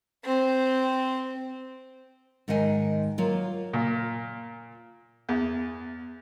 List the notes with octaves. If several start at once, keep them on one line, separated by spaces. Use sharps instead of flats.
C4
G#2 D#3 D#5 F#5 G#5
F#3 A#3 F4
A#2
E2